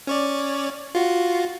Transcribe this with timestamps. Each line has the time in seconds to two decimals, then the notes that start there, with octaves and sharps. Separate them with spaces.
0.07 C#4 C#5 D5
0.95 F4 F#4